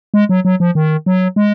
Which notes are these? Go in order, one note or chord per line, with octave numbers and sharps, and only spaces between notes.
G#3
F#3
F#3
F3
D#3
F#3
G#3